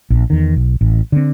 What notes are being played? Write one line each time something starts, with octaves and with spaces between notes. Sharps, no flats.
A#1
E2 D#3
B1
A1
D3 C4